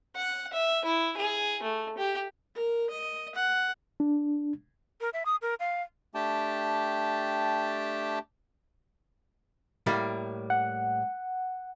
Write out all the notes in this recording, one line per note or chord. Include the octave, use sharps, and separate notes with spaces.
F#5
E5
E4
G#4
A3
G4
A#4
D#5
F#5
D4
A#4
E5
D#6
A#4
F5
A3 D4 G4 G5 A5
A2 G3 A#3
F#5